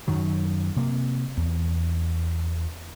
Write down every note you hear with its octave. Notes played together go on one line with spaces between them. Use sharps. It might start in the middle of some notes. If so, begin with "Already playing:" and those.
F#2 D#3 F#3
C3 A#3
E2